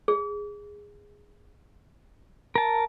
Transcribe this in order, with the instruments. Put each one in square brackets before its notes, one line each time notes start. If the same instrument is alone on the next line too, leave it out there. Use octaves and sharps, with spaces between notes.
[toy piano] G#4
[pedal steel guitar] A#4 A5